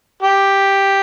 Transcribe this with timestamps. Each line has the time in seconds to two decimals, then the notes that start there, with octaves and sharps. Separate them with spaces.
0.22 G4